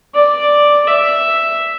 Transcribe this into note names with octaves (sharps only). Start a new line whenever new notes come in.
D5
E5